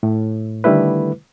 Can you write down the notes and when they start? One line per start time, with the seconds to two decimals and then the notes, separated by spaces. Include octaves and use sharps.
0.03 A2
0.64 D3 D#3 G3 A3 E4 B4